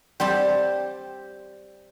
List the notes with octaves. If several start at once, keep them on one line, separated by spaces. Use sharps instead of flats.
G3 C4 G4 A5